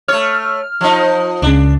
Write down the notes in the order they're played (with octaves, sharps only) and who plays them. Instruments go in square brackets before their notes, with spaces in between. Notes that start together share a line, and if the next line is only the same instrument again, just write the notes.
[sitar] A3 C#5 [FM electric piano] F6
[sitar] F3 D#4
[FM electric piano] C#2 C#3 [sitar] D4